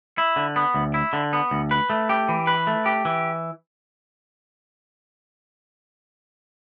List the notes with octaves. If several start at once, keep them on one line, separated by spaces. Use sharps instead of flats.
E4
D3
B3
D2
E4
D3
B3
D2
B4
A3
G4
E3
B4
A3
G4
E3